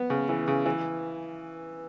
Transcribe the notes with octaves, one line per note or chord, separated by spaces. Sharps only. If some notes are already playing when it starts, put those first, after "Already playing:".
Already playing: B3
C#3
E3
C#3
E3